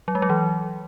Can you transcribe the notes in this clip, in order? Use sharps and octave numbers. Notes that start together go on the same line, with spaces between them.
F#3
G#3
F#3
E3